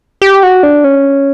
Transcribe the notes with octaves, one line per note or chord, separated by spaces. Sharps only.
G4
F#4
D4
C#4